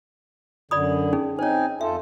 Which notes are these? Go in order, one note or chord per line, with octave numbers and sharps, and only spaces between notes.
F#2 D3 D5 B5 D#6
C#4 D#4 G#4
C4 D#4 C5 C#5 G#5
F2 F4 A4 E5